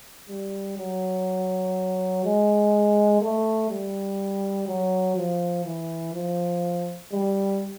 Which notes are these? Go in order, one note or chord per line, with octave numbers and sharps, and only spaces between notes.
G3
F#3
G#3
A3
G3
F#3
F3
E3
F3
G3